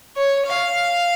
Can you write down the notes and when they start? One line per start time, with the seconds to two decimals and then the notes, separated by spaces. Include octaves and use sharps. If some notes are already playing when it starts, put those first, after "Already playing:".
0.17 C#5
0.46 F5